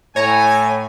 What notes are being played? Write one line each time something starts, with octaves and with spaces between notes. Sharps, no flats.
A2 C#5 G#5 A#5